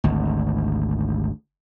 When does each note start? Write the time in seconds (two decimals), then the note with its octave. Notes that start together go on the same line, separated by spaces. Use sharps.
0.04 G#1 D2